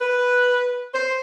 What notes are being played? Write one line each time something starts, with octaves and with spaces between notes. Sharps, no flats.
B4
C5